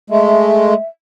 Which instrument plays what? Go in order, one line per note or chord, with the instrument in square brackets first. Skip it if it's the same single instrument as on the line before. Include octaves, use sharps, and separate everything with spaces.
[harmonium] G#3 A3 [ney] E5